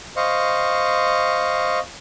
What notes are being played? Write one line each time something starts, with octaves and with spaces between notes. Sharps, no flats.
C5 D#5 F5 C#6